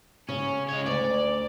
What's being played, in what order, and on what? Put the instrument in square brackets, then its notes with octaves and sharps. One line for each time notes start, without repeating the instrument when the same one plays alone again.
[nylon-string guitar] C#3 [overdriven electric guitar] C#4
[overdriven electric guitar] G#3 C#5
[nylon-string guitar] D2 [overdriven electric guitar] D5